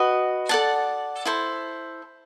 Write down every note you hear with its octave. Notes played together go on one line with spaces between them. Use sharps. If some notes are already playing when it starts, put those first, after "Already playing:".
Already playing: F#4 B4 D#5
A4 D5 F#5 A5
E4 A4 C5